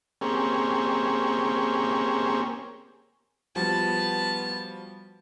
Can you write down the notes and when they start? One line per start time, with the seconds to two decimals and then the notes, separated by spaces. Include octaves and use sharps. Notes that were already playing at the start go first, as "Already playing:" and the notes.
0.21 A#3 C4 C#4 G4 G#4
3.56 F3 G3 B3 F#4 A5